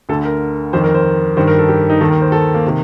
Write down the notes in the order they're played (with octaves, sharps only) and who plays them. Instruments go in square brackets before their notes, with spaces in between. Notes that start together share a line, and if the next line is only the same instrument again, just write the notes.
[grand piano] D2 D3 A4
A#4
F2 D#3 C5
A#4
C5
G2 D#3 C5
A#4
A4
G4
D#4
D#2 D#3 A4
A#4
C5
A4
A#3
C3 D#3